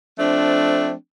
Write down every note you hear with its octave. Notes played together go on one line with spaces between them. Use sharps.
F3 A3 C4 D4